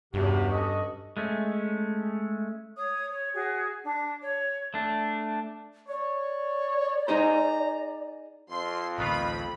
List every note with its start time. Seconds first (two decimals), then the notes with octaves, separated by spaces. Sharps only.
0.14 E2 G2 C3 C#4 F#4 G4
0.51 C#4 F#4 A4 D#5
1.17 G#3 A3 C#4
2.76 C#5 D#6
3.10 C#5
3.34 F#4 G#4
3.83 D4
4.21 C#5
4.74 A3 D4
5.88 C#5 D5
7.08 D#4 G#4 C5 A#5
8.50 F2 C6
8.98 A1 D2 D#3 B3 F4 B5